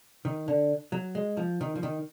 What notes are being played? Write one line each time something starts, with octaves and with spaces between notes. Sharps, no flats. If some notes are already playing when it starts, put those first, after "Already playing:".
D#3
D3
F#3
G#3
F3
D#3
F3
D#3